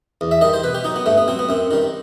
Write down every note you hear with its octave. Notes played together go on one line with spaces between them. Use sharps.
E2
E5
D#3 G3 D#5
C5
B2 B4
G4
F#3 D#4
B3
G2 A3
B3
F#3 C4
B3
F#2 C4
D#3 G3